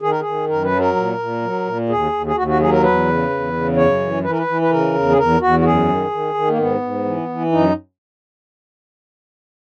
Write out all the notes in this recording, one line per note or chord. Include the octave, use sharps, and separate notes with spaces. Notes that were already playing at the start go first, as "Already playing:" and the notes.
D#3 G#4
A#4
G#4
D#3
F#2 A#4
B4
F#3
A#4
A#2
A#2
F#3
A#2
D#2 G#4
D#2
G#4
D#2 F#4
F#4
F#3 G#4
A#4
E2 B4
C#3
E2
C#3
F#2 C#5
E3
E3 B4
A#4
B4
E3
B4
C#3 A#4
E2
G#4
E2 A#4
E2 F#4
F#4
F#2 G#4
D#3
D#3
D#3
A#3
G#2 B3
G#2
E3
E3
F#2 D#4